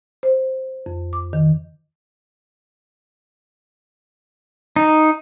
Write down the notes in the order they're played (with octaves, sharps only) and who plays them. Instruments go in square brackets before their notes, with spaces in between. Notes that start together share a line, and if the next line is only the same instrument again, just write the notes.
[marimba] C5
F2
D6
D#3
[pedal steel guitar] D#4